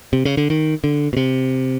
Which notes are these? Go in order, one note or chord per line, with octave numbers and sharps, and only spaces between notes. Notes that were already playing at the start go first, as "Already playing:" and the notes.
C3
C#3
D3
D#3
D3
B2
C3